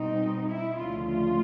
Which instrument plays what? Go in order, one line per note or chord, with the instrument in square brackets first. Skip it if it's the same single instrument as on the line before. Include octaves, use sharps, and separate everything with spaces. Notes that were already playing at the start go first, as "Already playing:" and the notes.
Already playing: [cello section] B2 G3 C4 D#4
E4
D2 C#3 F3 A3 F4
F4